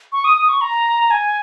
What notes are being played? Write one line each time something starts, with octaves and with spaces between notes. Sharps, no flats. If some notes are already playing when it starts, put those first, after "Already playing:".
C#6
D#6
D#6
C#6
A#5
G#5